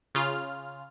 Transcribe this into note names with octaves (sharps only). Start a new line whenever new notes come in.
C#3 F4 F6